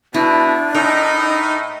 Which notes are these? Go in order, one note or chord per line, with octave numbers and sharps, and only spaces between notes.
B2 D4 E4
A2 D#4 A#4